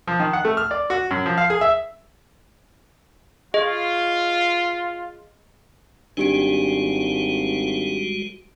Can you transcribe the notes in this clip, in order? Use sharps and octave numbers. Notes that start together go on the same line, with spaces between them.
F3
D#3
F#5
A3
F6
D5
F#4
F#2
F3
F5
G#4
E5
F4 G#4 D#5
G#1 G3 G#3 D4 F#4 G4 D7